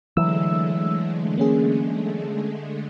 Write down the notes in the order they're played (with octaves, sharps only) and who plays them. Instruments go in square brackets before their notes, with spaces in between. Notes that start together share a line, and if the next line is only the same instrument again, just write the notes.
[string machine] D3 G#3 A3 [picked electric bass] E3 F#3 [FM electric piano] E6
[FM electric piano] A#3 C#4 G#4